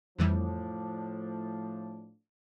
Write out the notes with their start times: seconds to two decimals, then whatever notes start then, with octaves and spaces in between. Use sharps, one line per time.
0.19 F2 A2 E3 F3 G3 D4